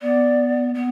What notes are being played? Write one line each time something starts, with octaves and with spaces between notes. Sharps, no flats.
B3 D5
B3